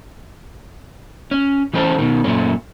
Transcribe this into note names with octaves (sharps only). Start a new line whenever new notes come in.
C#4
E3 A3 C4 C#4 A4
B2 D#3
F#2 A#2 A3 C#4